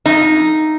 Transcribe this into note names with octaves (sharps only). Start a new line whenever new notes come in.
F2 D#4